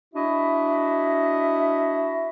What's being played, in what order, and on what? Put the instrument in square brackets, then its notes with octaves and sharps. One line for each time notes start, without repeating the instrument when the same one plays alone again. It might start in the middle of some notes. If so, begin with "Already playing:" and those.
[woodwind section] D4 E4 F#4 D#5 E5